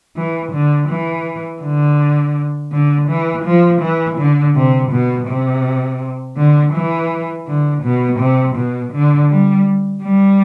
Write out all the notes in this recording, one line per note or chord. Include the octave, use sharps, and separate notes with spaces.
E3
D3
E3
D3
D3
E3
F3
E3
D3
C3
B2
C3
D3
E3
D3
B2
C3
B2
D3
G3
G3